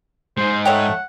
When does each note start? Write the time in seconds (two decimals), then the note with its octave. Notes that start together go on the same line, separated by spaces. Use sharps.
0.37 G#2 G#3 C5
0.65 A3 C#5 F#5 G5